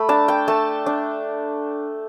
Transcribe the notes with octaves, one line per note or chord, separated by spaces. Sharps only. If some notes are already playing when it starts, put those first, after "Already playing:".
Already playing: A3 B5
D4 A5
G5
A3 A5
D4